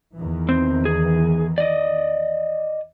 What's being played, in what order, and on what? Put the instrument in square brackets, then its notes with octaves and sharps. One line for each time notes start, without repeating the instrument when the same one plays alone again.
[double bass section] E2 D#3 E3
[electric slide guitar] C4
G#4
D5 D#5